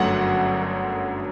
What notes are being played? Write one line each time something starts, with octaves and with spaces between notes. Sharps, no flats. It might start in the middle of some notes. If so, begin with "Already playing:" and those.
Already playing: G1 F#2 D3 F#3 A3 F#5